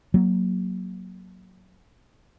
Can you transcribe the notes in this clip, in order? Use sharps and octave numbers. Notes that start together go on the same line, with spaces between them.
F#3 A#3